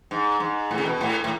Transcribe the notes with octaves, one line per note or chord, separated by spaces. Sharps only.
G#2
G#2
A2
C#3
B2
A2
A2